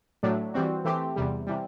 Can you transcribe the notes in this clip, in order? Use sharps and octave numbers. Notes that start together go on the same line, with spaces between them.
A2 F#3 A3 D4
E3 G3 C4 F#4
E3 A3 C4 G4
E2 C3 G3
C3 E3 G3